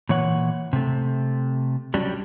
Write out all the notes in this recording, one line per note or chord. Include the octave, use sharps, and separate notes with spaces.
A#2 E3 C#5 F#5
C3 A3
F#3 G3 C#4 D4 G4